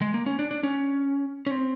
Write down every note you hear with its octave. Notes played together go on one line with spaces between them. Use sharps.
G#3
A#3
C#4
D4
D4
C#4
C#4
C4